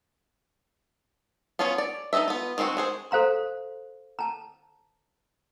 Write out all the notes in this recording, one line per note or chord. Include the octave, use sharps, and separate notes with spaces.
B3 C#4 F4 G#4 C#5
D5
D#4 A4 C5 D#5 E5
B3 F4
D#3 G#3 C4 E4 F#4
G#3 G#4 C5
A4 C5 F5 A#5 C6
A5 A#5